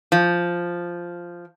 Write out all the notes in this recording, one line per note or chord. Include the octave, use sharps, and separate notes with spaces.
F3